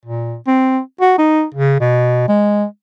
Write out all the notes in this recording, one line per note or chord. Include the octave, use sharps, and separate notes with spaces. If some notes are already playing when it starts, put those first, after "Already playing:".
A#2
C4
F#4
D#4
C#3
B2
G#3